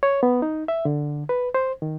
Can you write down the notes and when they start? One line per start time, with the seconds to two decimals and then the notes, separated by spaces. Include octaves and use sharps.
0.03 C#5
0.23 B3
0.42 D#4
0.68 E5
0.85 D3
1.29 B4
1.54 C5
1.82 D#3